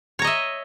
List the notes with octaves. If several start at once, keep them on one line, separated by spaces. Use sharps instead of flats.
C#5 D#5 E5 A#5